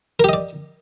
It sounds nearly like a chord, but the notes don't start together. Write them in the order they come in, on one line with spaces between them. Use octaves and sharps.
A#4 G4 D#5 D5